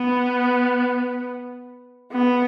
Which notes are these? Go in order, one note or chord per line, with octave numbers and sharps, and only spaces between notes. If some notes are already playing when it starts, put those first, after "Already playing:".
Already playing: B3
B3